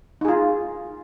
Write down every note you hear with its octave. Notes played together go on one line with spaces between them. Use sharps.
D#4 F4 G#4